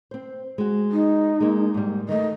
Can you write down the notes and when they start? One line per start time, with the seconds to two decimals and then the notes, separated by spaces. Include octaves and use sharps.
0.11 C4 C5
0.58 G#3 F#4
0.92 D#4
1.40 G#3 A#3
1.74 G#2 G3
2.09 D#3 A3 D#5